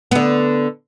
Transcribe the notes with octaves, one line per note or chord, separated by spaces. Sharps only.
D3 B3